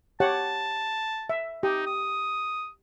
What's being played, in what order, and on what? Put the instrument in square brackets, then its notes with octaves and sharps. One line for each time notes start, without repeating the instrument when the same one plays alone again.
[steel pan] G4 C#5 F#5 [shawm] A5
[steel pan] E5
[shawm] D#4 [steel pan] G4
[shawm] D#6